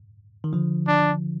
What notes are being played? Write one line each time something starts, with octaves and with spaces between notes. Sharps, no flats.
D#3
D3 F3
D4